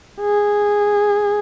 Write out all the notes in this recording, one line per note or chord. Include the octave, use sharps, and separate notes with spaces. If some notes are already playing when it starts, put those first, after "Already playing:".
G#4